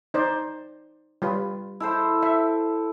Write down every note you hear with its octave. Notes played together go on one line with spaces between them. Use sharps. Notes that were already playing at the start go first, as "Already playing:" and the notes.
D#4 C5 D5
G3 F4 B4
E4 A4 C5
E5